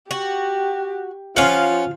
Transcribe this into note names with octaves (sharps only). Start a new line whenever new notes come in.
F#4 G4
F3 C#4 F4 F5 F#5